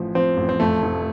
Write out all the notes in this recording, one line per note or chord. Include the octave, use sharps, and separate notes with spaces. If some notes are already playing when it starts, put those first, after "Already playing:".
Already playing: A1 F3
F3 C4
A1
C4
F2 A3
F1